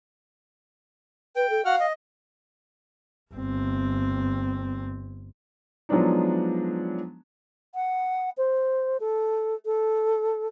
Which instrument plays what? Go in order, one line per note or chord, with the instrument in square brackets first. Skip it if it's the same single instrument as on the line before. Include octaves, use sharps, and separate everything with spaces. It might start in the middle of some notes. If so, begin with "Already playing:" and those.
[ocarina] B4 [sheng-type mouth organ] G5
[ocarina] A4
[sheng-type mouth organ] F#4 F#5 F6 [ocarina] F5
[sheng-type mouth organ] D#5
[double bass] G1 C4
[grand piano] F3 F#3 G#3 B3 D4 D#4
[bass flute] F#5
C5
A4
A4